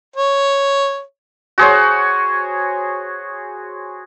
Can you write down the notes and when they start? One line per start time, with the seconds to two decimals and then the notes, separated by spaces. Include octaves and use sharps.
0.16 C#5
1.58 F#4 G#4 C5 C#5